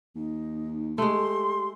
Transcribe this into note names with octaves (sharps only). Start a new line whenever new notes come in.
D#2 D#4
G#3 A3 G4 C6